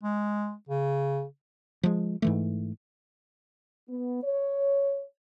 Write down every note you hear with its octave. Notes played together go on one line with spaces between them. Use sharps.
G#3
C#3
F3 G#3
G#2 E3 A3
B3
C#5